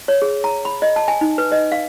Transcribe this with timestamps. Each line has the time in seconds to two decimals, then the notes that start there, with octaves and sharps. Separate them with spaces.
0.08 C#5
0.22 G#4
0.44 A#5
0.65 B5
0.82 D#5
0.96 A5
1.08 G#5
1.21 D#4
1.38 B4
1.52 D#5
1.72 F5